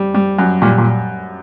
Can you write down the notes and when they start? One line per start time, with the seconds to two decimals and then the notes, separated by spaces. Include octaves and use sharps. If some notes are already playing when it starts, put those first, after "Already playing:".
Already playing: G3
0.14 G3
0.39 F#2
0.62 A#2 G3
0.78 A#2